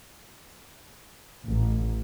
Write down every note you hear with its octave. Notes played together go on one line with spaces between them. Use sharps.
A1